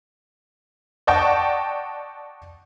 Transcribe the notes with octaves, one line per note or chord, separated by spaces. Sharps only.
D5 D#5 F#5 G5 A5 C#6